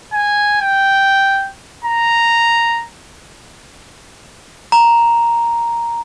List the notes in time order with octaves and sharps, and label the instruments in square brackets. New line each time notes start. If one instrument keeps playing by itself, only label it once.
[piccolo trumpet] G#5
G5
A#5
[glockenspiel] A#5